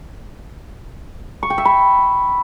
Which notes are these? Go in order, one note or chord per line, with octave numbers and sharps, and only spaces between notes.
C#6
G5
E5
B5